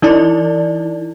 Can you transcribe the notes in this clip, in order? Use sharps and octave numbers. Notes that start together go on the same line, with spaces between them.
E3 D#4 E4 D5